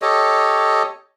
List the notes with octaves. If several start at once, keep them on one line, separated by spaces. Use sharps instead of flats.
G4 A4 C#5 D#5